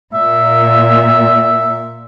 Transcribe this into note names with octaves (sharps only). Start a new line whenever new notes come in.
A#2 E5